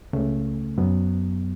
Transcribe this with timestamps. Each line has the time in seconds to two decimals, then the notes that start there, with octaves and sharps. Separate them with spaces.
0.13 C#2 C#3 A3
0.78 F#2 F#3 B3